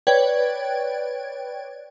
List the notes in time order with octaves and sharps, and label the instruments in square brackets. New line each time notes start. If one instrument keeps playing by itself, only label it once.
[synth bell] B4 C#5 D5 G5 G#6